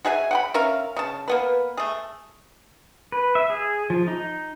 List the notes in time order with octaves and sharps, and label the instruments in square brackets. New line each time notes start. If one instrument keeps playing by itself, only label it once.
[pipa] F#4 G#4 E5 G#5
F#5 G5 B5
C#4 A#4 E5 F5
C#3 A5
A#3 B3 B4
A3 G#4
[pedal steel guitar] B4
E5
G#4
F3
D#4